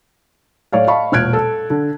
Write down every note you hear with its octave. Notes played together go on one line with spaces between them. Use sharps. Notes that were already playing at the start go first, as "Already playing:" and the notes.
A2 C#5 D5 F5
D#5 F5 A5 B5 C#6
E1 A#2 F6 F#6 G#6 D7
A4
D3